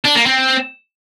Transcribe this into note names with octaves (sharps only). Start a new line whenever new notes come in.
D4
A#3
C4